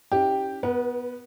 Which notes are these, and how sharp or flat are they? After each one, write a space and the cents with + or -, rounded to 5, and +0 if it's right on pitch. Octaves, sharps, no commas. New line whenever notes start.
C#4 +0 E4 -35 G4 +0
B3 +0 B4 -40